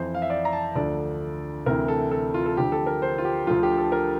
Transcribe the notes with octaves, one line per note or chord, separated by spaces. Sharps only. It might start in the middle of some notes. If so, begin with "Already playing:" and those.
Already playing: F2 E3 C5
F5
E5
D5
A#5
A5
D2 D3 F3 D5
D2 C3 E3 A#4
A4
A4
F4
A4
D2 D3 F3 G4
A4
A#4
C5
F4
G4
D2 D3 F3 F4
G4
A4
A#4